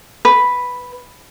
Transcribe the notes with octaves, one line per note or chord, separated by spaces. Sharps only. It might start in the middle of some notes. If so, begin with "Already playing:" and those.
B4